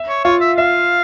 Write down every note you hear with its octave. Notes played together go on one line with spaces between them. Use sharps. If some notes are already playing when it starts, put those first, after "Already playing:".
Already playing: E5
C#5
F4 C#5 F5
E5
E5 F5